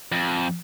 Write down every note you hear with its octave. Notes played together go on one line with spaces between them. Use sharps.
F2